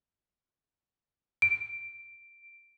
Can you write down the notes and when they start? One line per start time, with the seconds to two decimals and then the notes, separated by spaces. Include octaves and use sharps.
1.42 D7